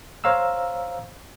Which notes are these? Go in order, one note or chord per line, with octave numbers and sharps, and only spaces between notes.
C5 C#5 F5 A#5 E6